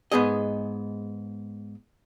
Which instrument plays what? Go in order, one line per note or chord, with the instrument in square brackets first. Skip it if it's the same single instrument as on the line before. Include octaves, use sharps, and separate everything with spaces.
[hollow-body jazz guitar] G#2 B3 G#4 D#5